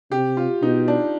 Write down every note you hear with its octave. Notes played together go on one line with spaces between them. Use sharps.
C3 G4
F4
B2 D#4
D4